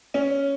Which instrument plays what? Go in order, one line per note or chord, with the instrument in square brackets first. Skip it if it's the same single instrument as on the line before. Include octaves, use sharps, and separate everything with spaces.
[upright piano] C#4